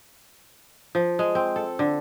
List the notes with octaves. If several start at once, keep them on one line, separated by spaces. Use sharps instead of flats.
F3
G#3
C4
A4
D3